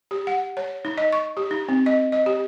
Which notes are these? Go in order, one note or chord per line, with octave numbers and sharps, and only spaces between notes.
G4
F#5
C#5
D#4
D#5
C#6
G4
D#4
C4
D#5
D#5
G4